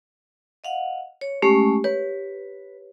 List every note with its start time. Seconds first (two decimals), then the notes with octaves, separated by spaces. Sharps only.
0.64 D#5 F5 F#5
1.21 C#5
1.42 G#3 A3 C#4 G4
1.84 B4 C#5